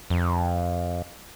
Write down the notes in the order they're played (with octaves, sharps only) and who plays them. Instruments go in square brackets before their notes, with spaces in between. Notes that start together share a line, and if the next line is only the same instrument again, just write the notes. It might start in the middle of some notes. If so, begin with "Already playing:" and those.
[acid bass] F2